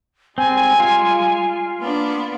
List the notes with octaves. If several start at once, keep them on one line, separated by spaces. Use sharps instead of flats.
G3 G#3 C4 G#5
F4
A#3 B3 D4